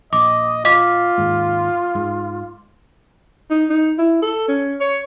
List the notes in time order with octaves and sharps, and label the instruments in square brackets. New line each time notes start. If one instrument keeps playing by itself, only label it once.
[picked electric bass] A#1 [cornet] D#5 [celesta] D6
[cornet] F4 [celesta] D#5 D6 B6
[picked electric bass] G#1 D#2 G#2
G#2
[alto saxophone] D#4
D#4
E4
A4
C#4
C#5